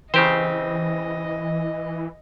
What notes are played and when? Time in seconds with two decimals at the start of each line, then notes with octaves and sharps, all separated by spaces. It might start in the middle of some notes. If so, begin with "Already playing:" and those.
0.14 C#3 E3 C4 G4 C5 D#5